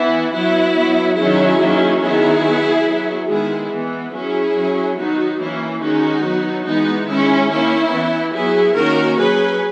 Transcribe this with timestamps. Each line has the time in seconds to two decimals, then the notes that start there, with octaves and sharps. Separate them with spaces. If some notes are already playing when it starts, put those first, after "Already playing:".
Already playing: E3 B3 E4
0.33 F#3 B3 E4
0.75 F#3 B3
1.17 D#3 F#3 C#4 E4 G#4
1.59 D#3 F#3 A#3 C#4
2.01 D#3 F#3 B3 E4 G#4
2.43 F#3 B3
2.85 F#3 B3
3.27 D#3 G#3 B3 E4 G#4
3.69 E3 B3
4.12 F#3 C#4 E4 G#4
4.54 F#3 C#4
4.96 D#3 F#3 B3 D#4 F#4
5.39 E3 A#3 C#4 E4
5.80 D#3 G#3 C#4 D#4 F#4
6.23 F#3 B3
6.64 E3 G#3 B3 D#4
7.07 D#3 G#3 C#4 E4
7.49 D#3 A#3 C#4 E4
7.91 E3 B3
8.33 F#3 B3 E4 G#4
8.75 D#3 A#3 C#4 F#4 A#4
9.18 F#3 C#4 G#4 B4